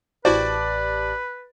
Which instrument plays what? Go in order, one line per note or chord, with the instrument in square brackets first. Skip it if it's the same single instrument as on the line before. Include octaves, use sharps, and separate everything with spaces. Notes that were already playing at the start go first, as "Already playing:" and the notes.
[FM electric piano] A1 G4 A5 [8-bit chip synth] E4 F#4 C5 [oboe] B4 [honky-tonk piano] D5